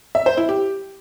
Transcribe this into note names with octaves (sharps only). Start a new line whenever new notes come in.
E5
C5
E4
G4